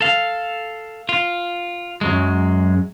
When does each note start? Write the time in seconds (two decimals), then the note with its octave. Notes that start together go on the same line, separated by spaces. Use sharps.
0.01 A4 F5
1.09 F4
2.01 F#2 F#3 G#3